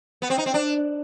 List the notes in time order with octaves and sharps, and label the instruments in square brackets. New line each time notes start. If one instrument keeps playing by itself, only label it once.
[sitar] B3
C4
D#4
C4
D4